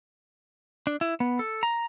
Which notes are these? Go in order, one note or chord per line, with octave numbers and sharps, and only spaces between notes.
D4
E4
B3
A4
A#5